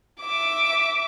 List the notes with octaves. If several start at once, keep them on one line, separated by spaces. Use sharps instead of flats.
E5 D6